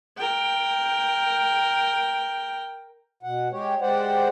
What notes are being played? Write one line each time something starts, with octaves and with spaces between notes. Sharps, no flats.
A#4 G5
B2 F#5
G#3 G4 C#5
G#3 G4 C5 D5 F#5